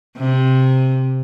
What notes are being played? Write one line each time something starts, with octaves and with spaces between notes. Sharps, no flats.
C3